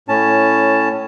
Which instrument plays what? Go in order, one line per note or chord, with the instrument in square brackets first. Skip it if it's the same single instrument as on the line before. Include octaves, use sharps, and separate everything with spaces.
[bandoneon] A2 C#4 A5